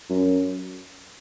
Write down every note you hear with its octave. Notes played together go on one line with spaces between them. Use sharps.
F#2